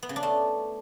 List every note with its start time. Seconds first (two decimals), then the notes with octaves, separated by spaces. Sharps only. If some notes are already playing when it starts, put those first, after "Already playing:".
0.03 B3
0.09 C#3
0.16 D4
0.23 A3